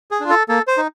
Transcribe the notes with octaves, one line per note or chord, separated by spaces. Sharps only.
G#4
D4 F4
A4
A#3 A4
C5
D#4